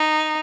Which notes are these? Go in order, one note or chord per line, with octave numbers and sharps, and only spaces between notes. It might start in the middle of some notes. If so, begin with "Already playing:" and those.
Already playing: D#4